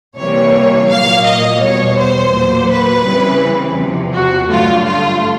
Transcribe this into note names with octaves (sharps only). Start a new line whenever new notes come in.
C3 E3 G3 A#3 C#5
A#2 F#3 A#3 F5
D#5
E2 B2 G3 C#5
C5
A#2 F#3 A#3
B4
C#3 E3 G3 C4
E2 C3 F3
F#4
G2 D3 F#3 A3 F4
F4